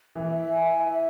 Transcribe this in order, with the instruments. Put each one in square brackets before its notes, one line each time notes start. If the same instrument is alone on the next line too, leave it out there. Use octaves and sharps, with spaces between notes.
[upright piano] E3 [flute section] E5
[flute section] E5
G#5
E5
E5